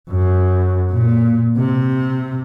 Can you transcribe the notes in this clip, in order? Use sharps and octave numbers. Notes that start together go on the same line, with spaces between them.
F#2
A#2
C3